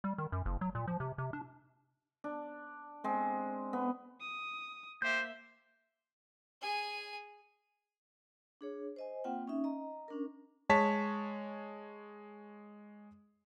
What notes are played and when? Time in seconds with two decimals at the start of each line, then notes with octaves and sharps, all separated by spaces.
0.04 G3
0.18 D#3
0.32 F#2
0.46 F#1
0.61 F#3
0.75 A#2
0.88 F3
1.00 C3
1.18 C3
1.33 D4
2.24 D4
3.04 G#3 C4
3.73 B3
4.21 D#6
5.02 A#3 G4 C5 E5 G6
6.61 G#4 G#5
8.61 D4 G#4 C#5
8.96 C5 D#5 G#5
9.24 A#3 C4 F4 F#5 G5
9.47 C#4 D#4 E5
9.64 D#5 A#5
10.08 C#4 D4 A#4
10.69 G#3 C#5 A5 B6